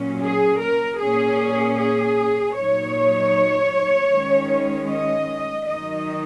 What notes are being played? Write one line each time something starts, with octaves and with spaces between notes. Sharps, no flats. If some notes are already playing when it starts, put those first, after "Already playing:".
Already playing: A#2 F#3 C#4
G#4
A#4
A#2 A#3 C#4 G#4
G#4
A#2 F#3 D#4 C#5
D#3 G#3 C#4
D#5
D#3 F#3 D#4 D#5